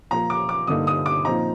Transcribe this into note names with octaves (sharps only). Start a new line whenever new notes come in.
A#2 F3 A#3 A#5
D6
D6
G2 D3 G3 A#3 D#4 D#6
D#6
D6
A#2 F3 C4 D#4 A#5